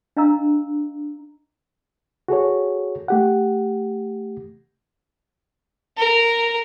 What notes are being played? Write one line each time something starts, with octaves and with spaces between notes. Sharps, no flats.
D4 D#5 F5 A#5 E6
F#4 G#4 A4 C#5
A3 G4 F#5
A#4